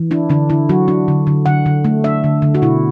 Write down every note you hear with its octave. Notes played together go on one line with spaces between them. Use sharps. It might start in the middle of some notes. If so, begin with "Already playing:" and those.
Already playing: E3
D4 E4
D3 D4
D3 E4
F#3 F#4
D4
D3
D3
D3 F#5
D3
A3
D4 E5
D3
D3
F#4
B2 E4